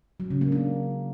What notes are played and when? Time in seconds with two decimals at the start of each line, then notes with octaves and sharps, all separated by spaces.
0.20 F#3
0.30 C#3
0.41 A#3
0.52 D4